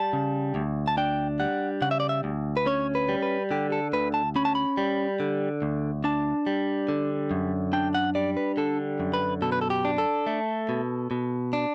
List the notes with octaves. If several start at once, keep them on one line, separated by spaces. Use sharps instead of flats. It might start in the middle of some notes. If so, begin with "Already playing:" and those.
Already playing: G3 A5
C#3
D2
A5
D4 G5
G3 F#5
C#3 F#5
E5
D5
E5
D2
B4
C#4 C#5
B4
G3
B4
D3 G4
A4
D2 B4
A5
C#4 B5
A5
B5
G3
D3
D2
D4 A5
G3
D3
F#2
D4 G5
F#5
G3 D5
B4
D3 A4
F#2
B4
B2 A4
B4
A4
G4
D4
A4
A3
B2
B2
D4